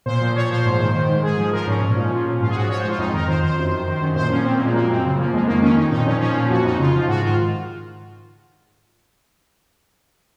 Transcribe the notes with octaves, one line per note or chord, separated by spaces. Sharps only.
A#2 C5
F3
F3 C#5
A#2 C5
G#2
D#3
D#3
G#2
G#2 G#4
F3
F3 A#4
G#2 C#4
A#2
F3
F3
A#2
G#2 F4
G#4
F3 F#4
F3 C#5
C5
G#2 F4
F2 D#4
D#3 A#4
D#3 C5
F2 C5
F#2
D#3
D#3
F#2
A#2 C5
F3 C#4
F3 C4
A#3
A#2 G#3
F#2 A#3
F#2 C4
C#3
F3 A#3
F2 G#3
D#3 A#3
D#3 C#4
F2 D#4
A#2 D#4
F3 C#4
F3 C#4
A#2
F2 F#4
F2 D#4
C#3 F4
F3
G#2 F#4
D#3 F4